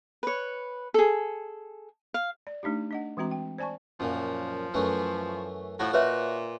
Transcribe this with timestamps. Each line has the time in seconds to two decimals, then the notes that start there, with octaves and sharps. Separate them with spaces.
0.23 B4 C#5
0.94 G#4 A4
2.14 F5
2.47 D5
2.63 A3 D4 D#4 G4
2.91 D4 D#5 F#5
3.17 E3 G#3 C4 F#4 A#5
3.31 G5
3.58 C5 D5 G#5 A5 C#6
4.00 F#2 A#2 F3
4.74 F#2 E3 A3
5.79 A2 F3 F#4
5.93 A#2 F#4 B4 C#5 D#5 E5 F#5